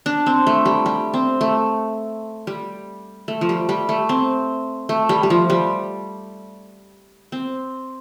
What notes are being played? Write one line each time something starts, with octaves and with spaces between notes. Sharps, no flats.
D4
C4
A3
G3
G3
C4
A3
G3
A3
F3
G3
G3
A3
C4
A3
G3
G3
F3
G3
C4